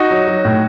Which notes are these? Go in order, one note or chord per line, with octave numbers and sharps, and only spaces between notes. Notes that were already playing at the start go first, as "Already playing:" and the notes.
Already playing: D#4 F#4
F#3
F#3
A2